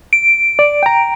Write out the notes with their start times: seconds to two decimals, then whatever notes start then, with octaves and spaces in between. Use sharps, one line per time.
0.13 D7
0.59 D5
0.83 G5 A#5